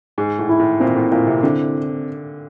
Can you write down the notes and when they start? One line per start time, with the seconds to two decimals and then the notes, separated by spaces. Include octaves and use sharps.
0.18 G#2 G#4
0.39 A2
0.49 E4
0.59 A2
0.80 A#2 C4
0.96 A2
1.12 A#2 E4
1.27 C3
1.43 D3 C4